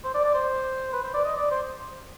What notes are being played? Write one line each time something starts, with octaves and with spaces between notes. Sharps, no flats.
C5
D5
D5
C5
B4
C5
D5
D#5
D5
C5